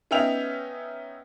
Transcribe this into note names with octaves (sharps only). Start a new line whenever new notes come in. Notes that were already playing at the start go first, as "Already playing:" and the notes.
B3 C#4 D#4 E5 G5 F7